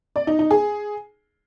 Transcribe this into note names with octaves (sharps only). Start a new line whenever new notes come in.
D5
D#4
D#4
G#4